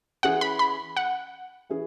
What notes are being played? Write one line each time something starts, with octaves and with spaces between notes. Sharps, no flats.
E3 C#4 G#4 F#5
B5
B5
F#5
E3 C#4 G#4